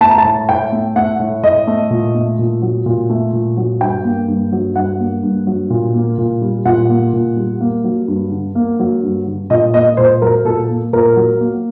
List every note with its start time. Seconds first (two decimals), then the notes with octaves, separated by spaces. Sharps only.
0.01 A3 A5
0.10 A#5
0.18 A5
0.25 A2
0.49 A2 G5
0.72 A3
0.96 A3 F#5
1.19 A2
1.43 A2 D#5
1.67 A3
1.91 A#2
2.14 A3
2.39 A#2
2.62 F#3
2.86 A#2
3.09 A3
3.33 A#2
3.57 F#3
3.81 G2 G5
4.04 A#3
4.28 G2
4.52 F#3
4.75 G2 F#5
4.99 A#3
5.23 G2
5.47 F#3
5.70 A#2
5.94 A#3
6.18 A#2
6.42 G3
6.65 A#2 F#5
6.90 A#3
7.13 A#2
7.36 G3
7.61 A#3
7.84 F#3
8.08 G2
8.31 D3
8.55 A#3
8.79 F#3
9.03 G2
9.27 D3
9.50 A#2 D#5
9.73 A#3 D#5
9.97 A#2 C5
10.22 F#3 A#4
10.45 A#2 A4
10.69 A#3
10.93 A#2 A#4
11.16 F#3
11.40 A#3